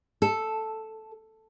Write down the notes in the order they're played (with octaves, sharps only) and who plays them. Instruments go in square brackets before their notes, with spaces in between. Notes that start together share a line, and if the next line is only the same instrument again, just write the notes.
[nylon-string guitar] A4